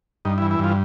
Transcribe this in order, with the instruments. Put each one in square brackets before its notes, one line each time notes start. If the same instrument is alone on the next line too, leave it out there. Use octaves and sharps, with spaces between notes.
[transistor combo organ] G2 D#4
E4
E3
E4
G2 F4